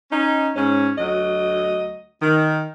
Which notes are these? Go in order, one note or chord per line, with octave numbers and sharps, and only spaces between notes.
C#4 D#4
G#2 C#4
D2 F#3 D#5
D#3